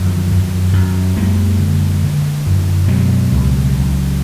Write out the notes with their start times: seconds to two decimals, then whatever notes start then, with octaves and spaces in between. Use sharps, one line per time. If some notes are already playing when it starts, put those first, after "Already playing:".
Already playing: F#2 D3 D#3 F3
0.31 F#2
0.73 F#2
1.16 F#2 G#3 A#3
1.59 D3
2.03 D3
2.46 F#2
2.88 B2 F#3 G#3
3.32 C#2
3.74 C#2